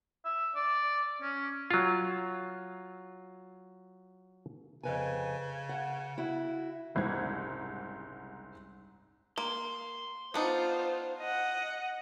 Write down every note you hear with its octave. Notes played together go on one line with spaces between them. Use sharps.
E5
D5
C#4
F#3 F4
F2 C#3 B4 G#5
F#5
E4 F#4
F#1 C2 G#2 G#6
A#3 C6
B3 D4 D#4 F4 C5
D#5 F#5